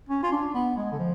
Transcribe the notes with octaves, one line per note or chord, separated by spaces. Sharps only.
C#4
F4
D4
B3
G#3
D3
F3